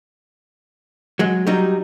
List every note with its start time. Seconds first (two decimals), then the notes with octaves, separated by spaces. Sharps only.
1.19 F#3 G#3
1.47 F#3 G3 D#4